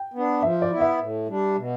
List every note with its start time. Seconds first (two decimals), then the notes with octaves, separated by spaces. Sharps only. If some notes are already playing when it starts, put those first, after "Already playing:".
Already playing: G5
0.14 B3 D4
0.43 F3 E5
0.62 D5
0.71 B3 E4
0.81 E5
0.99 A2
1.28 G3 D4
1.56 B2